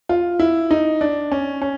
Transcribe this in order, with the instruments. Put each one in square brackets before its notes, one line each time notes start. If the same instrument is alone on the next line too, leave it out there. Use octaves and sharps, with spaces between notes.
[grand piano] F4
E4
D#4
D4
C#4
C#4